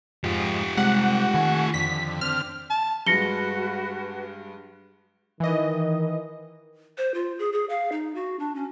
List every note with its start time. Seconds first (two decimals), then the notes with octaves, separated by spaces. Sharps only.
0.24 F2 G#2 F4 G4
0.77 C3 G3 G#3 F#5
1.34 D#3 A3 G#5 C#6
1.74 F2 D3 B6
2.21 D3 C4 F6
2.70 A5
3.06 G2 G#3 F#4 B4 A#6 C#7 G7
5.40 D#3 E3 D#5
6.98 C5
7.14 F4
7.39 G#4
7.53 G#4
7.69 F5
7.92 D#4
8.15 F#4
8.39 D4
8.55 C#4